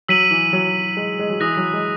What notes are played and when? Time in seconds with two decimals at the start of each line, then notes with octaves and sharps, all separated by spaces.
0.08 F#3 E6 B6 D#7 F#7
0.31 E3
0.53 F#3
0.97 G#3
1.19 G#3
1.30 F#3
1.40 E3 D#6 F#6 A#6
1.57 F#3
1.73 G#3